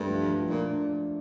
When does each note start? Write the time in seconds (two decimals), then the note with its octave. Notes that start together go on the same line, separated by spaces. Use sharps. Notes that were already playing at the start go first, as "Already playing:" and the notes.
Already playing: G2 A3
0.09 F3
0.29 F3
0.49 A#2 D4